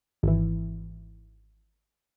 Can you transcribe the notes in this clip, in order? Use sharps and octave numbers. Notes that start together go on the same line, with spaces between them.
G#1 E3